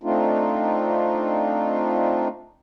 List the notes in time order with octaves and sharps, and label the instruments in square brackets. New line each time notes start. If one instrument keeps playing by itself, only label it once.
[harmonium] A3 C4 D4 D#4 F4